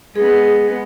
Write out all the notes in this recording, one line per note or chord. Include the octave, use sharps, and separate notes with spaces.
G#3 B3 G#4